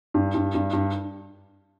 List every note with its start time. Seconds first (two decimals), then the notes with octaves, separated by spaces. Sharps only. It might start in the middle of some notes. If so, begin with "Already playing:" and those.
0.14 G2
0.35 G2
0.55 G2
0.73 G2